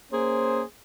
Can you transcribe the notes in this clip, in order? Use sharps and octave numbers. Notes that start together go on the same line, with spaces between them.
A#3 C#4 G#4 C5